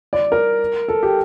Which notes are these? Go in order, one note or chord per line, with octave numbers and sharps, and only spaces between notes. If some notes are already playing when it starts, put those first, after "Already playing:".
D5
A#4
A4
G4